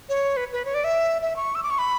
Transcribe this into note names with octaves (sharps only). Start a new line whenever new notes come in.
C#5
B4
B4
C#5
D5
E5
E5
C#6
E6
D6
C#6
B5